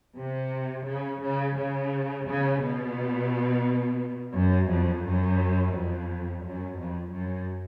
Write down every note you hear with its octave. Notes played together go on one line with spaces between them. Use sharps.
C3
C#3
C#3
C#3
C#3
B2
F#2
F2
F#2
F2
F#2
F2
F#2